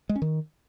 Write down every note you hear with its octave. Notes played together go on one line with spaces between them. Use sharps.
G#3
C#4
D#3